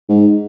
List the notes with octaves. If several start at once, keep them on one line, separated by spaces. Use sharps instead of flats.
G#2